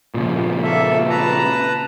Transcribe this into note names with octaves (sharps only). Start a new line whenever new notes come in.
A#2 C#3 F3
A#3 A4 E5
B4 A5 A#5